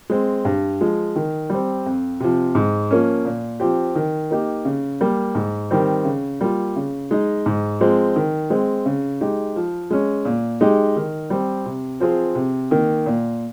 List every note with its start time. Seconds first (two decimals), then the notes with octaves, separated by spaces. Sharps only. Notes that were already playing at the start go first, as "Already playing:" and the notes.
0.10 G#3 C4
0.45 G2
0.81 F3 G#3
1.16 D#3
1.50 G3 C4
1.86 F2
2.20 C3 F3
2.55 G#2
2.91 F3 A#3 C#4
3.25 A#2
3.60 F3 C4 G4
3.95 D#3
4.31 A#3 D#4 G4
4.65 C#3
5.01 G3 A#3
5.35 G#2
5.71 D#3 G3 C4
6.05 C#3
6.41 G3 A#3 F4
6.76 C#3
7.11 G#3 D#4
7.46 G#2
7.81 F3 G#3 C4
8.16 D#3
8.50 G#3 C4
8.86 C#3
9.21 G#3 D#4 G4
9.56 F3
9.90 G#3 C#4
10.25 A#2
10.61 G#3 D#4 G4
10.96 D#3
11.30 G3 C4
11.66 C3
12.00 F3 C4 F4 G#4
12.35 C3
12.71 D#3 A#3
13.06 A#2